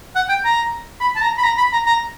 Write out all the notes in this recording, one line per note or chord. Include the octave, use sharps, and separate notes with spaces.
F#5
G5
A#5
B5
A5
A#5
B5
A#5
B5
A#5
A#5